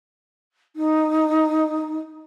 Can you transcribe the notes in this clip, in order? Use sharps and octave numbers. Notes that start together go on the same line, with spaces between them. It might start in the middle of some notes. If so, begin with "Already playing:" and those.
D#4